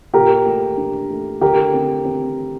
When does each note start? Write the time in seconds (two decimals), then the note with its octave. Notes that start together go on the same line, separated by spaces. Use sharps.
0.14 A#2 G4 A#4
0.46 A3
0.77 D4
1.10 A3
1.41 D3 G4 A#4
1.74 C4
2.05 C4